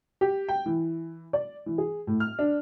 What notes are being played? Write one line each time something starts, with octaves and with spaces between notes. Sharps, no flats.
G4
G5
E3
D5
E3
G#4
A2
F6
D4